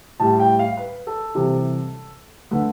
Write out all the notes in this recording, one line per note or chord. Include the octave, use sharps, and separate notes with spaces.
A2 G3 A5
G5
F5
B4
A4
C3 E3 G3
D3 A3 B4